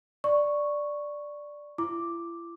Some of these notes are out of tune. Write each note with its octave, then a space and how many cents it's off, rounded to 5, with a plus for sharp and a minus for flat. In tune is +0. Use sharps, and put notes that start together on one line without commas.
D5 +0 C#6 +0
E4 +45 D6 +0